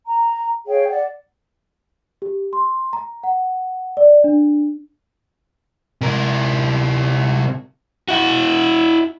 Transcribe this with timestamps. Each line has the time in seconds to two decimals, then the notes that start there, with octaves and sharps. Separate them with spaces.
0.06 A#5
0.67 G#4 C#5 F5 G5
0.90 D5 F#5
2.22 G4
2.53 C6
2.93 A#5
3.23 F#5
3.97 D5
4.24 D4
6.01 C3 A#4
8.08 E4 F#4